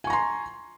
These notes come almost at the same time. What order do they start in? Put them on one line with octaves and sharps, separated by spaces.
G#5 C#6 A#5 C6